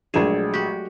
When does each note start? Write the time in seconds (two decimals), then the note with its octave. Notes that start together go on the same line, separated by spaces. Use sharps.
0.14 A#1 F#3 G#3 A3 G#4 E7
0.54 F#4 G4